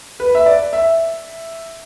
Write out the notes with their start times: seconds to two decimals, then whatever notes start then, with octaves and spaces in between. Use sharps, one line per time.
0.20 B4
0.35 E5
0.46 D5
0.73 E5